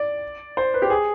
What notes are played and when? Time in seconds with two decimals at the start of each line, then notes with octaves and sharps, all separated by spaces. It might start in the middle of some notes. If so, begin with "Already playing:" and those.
Already playing: D5
0.57 C5
0.74 B4
0.82 G4
0.90 G#4